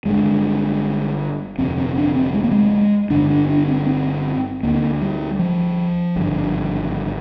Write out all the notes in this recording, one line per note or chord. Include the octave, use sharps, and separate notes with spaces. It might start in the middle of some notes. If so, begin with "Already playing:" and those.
G1 G2 D3 G#3
G1 F2 C3 C4
C4
D4
C4
G#3
A#3
G#3
G1 G2 D3 D4
D4
D4
C4
C4
D2 D3 A#3
G3
F3
G#1 G2 D3